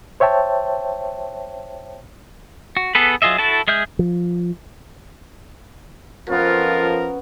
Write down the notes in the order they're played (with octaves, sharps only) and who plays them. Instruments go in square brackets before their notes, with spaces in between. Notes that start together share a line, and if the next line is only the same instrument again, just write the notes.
[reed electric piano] C5 C#5 E5 G5 A5
[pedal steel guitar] F#4
B3 G#4 A4 B4
F#3 F4 G#4 D#5 E5
E4 F#4 A4 A5
G#3 G#4 E5 F6 G6
[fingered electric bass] F3
[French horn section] F2 F3 A#4 [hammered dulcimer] B3 C#4 [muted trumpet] F4